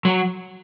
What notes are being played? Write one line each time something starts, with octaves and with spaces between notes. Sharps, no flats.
F#3